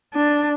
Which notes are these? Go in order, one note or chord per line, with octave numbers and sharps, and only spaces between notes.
D4